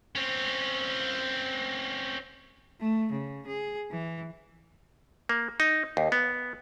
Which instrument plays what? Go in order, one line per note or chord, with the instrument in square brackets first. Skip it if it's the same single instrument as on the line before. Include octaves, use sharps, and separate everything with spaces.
[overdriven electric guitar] C4 C#4
[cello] A3
C#3
G#4
E3
[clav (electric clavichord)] A#3
D#4
D#2
B3